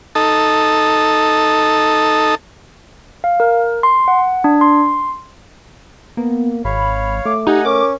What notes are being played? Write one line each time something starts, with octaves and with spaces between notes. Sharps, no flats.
D#4 A4
F5
A#4
C6
F#5
D4
C6
A#3 B3
G#1 C#5 F5 B5
A3 D6
D#4 G4 D#5 F#5 G#5
C#4 A#4 D6